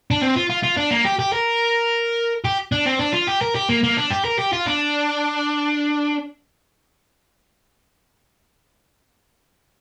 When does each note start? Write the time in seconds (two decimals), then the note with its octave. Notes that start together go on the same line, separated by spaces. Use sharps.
0.11 D4
0.21 C4
0.36 F4
0.50 F4
0.63 F4
0.77 D4
0.91 A#3
1.05 G4
1.19 G4
1.33 A#4
2.45 G4
2.72 D4
2.86 C4
3.00 D4
3.14 F4
3.28 G4
3.42 A#4
3.55 G4
3.69 A#3
3.83 A#3
3.97 D4
4.11 G4
4.25 A#4
4.39 G4
4.52 F4
4.66 D4